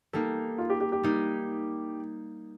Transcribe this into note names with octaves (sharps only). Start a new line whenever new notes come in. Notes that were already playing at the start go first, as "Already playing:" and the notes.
G3 A#3 D#4 A4
F4
G4
G4
G4
G3 A#3 D#4